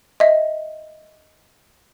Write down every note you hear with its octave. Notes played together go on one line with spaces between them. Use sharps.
D#5 E5